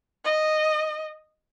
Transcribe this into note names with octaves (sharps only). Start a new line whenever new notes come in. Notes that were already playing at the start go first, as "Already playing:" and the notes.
D#5